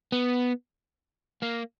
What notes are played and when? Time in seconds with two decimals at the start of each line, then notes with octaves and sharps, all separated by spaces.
0.12 B3
1.43 A#3